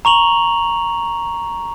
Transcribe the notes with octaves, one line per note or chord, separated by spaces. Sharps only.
A#5 C#6 F7 F#7